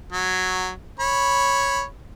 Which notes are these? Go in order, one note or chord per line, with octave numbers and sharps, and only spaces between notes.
F#3
C#5 B5